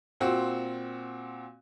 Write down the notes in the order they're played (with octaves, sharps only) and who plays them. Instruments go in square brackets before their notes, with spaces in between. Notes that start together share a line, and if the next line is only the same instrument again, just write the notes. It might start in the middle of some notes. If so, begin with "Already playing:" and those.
[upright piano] A#2 C4 F#4